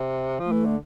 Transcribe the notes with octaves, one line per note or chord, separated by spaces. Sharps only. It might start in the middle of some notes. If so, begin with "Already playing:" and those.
Already playing: C3
F3
A3
E3
D3